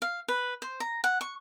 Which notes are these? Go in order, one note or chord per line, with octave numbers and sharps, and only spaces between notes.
F5
B4
C5
A#5
F#5
C#6